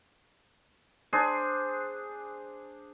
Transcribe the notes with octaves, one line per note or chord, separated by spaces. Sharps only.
D4 G#4 C5